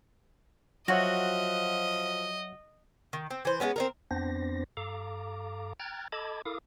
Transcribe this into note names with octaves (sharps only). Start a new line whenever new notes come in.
F3 F#3 F#4 C#5 D#5 E5
D#3
C4
E3 C5
G#3 A#3 B3 C#4
C4 D#4 A#4
F2 B3 C4 D4 C5 A#6
G2 A4 F5 A#5 D6
G5 A#5 F6 F#6 G#6 A6
A4 D#5 A5 B5 D6 G#6
E4 A4 A#4 F5 D6 D#6